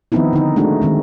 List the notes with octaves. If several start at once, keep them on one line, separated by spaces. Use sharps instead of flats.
D#3 F3 B3 C4 D#4 E4
D3 D#4
G#3 A3 D4 D#4 F#4
D#3 G#3 C4